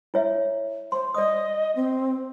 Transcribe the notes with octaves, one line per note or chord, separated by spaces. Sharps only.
E4 C#5 E5
C5 C6
D5 D#5 D#6
C4